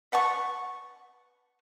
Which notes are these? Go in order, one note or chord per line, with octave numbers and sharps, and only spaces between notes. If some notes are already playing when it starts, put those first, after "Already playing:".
B4 F#5 A5 C#6